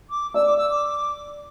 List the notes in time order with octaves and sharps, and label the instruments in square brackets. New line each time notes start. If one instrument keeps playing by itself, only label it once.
[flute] D6
[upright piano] D5 [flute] E6
[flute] D6
E6
D6